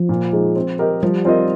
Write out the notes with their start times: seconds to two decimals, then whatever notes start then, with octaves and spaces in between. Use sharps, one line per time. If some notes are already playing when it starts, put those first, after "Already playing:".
Already playing: F3
0.09 A#2
0.33 F3 G#3 D#4 G#4
0.56 C4
0.79 G4 A#4 D#5
1.03 F3 G3
1.25 C4 F4 A#4 D#5